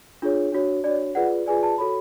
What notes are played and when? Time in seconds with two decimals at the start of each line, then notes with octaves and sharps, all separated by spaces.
0.22 D4 F4 G#4 C#5
0.52 D4 F#4 C#5
0.84 D4 F#4 C#5 D5
1.15 F4 G#4 B4 D5 F#5
1.46 F4 G#4 B4 D5 G#5
1.63 A5
1.78 F#4 A4 C#5 B5